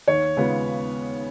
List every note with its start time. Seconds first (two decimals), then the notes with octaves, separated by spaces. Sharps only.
0.08 D#2 C#5
0.37 C#3 G#3 B3 F4